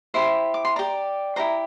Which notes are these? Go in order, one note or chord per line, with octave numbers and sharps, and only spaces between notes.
E4 G4 C5 C6
D6
C6
G4 D5 A#5
E4 G4 C5 A#5